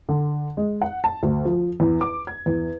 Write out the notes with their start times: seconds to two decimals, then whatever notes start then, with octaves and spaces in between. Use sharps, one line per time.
0.09 D3
0.57 G#3
0.82 F#5
1.04 A5
1.23 D2
1.45 F3
1.80 E2
2.01 D6
2.27 G#6
2.46 E2